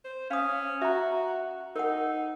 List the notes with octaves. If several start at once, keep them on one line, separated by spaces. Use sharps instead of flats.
C5
C#4 F5 D#6
F#4 E5 A#5
D#4 A#4 F#5